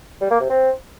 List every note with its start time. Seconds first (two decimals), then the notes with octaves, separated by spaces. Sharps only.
0.21 G3
0.31 A#3
0.40 C3
0.50 C4